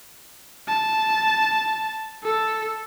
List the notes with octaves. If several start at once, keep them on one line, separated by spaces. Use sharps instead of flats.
A5
A4